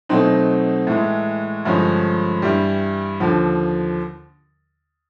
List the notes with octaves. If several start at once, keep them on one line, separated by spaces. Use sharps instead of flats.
B2 F#3 A3 C4 D#4
A2 E3 G#3
G2 D3 F3 G#3 C#4
G2 E3 G3
D#2 D3 F3